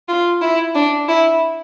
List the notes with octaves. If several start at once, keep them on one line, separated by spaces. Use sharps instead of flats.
F4
E4
D4
E4